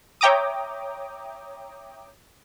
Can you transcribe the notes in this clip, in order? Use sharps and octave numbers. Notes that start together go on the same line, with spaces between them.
C#5 E5 G5 A#5 D6 D#6